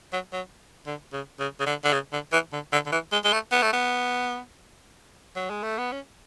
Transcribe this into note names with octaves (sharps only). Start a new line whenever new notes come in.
F#3
F#3
D3
C#3
C#3
C#3
D3
D3
C#3
D3
E3
D3
D3
D3
E3
G#3
G#3
A3
B3
A3
B3
F#3
G#3
A3
B3
C#4